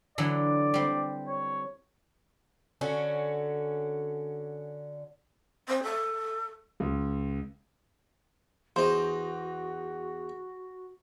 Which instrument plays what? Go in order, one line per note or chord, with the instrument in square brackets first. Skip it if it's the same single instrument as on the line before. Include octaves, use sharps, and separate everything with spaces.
[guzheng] D3 E3 F#3 [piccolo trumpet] D5
[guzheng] G3 C4
[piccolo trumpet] C#5
[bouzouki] D3 C#4 F#4
[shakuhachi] C4
A4
[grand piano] C#2
[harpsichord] E2 D#5 [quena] F#4 [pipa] C5